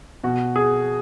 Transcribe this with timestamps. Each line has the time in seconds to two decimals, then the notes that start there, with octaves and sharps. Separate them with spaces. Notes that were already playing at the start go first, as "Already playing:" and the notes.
0.24 B2 F#4
0.56 G#4